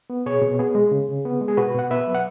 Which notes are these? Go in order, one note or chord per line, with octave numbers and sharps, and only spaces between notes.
B3
B2 G#4 C#5
B2
B3 G#4
G#3
C#3
C#3
B3
G#3
G#4
B2 F#4 B4
B2 F#5
B3 B4 E5
F#3
F#5